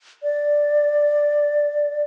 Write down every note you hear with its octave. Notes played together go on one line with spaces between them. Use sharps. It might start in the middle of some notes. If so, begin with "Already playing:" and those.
D5